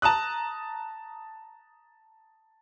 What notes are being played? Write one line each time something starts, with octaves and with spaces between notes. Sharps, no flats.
A5 A#5 D#6 F#6